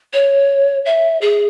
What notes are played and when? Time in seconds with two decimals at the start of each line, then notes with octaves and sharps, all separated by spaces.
0.13 C#5
0.86 E5
1.21 G#4